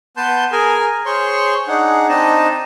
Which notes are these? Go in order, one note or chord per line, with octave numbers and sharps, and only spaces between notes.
B3 B4 A5 C6 G6
G#4 A#4 G#5
G#4 C5 C#5 C6 C#6
D4 D#4 G#4 F#5
C4 D4 D#4 D#5 A5